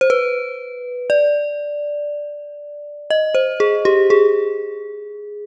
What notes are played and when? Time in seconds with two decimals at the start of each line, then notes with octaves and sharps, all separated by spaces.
0.01 C5
0.10 B4
1.10 D5
3.10 D#5
3.35 C5
3.60 G#4
3.85 G4
4.10 G#4